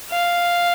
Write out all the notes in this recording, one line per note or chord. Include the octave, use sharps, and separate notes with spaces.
F5